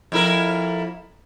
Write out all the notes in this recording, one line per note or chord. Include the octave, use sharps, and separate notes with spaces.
F2 E4 A#4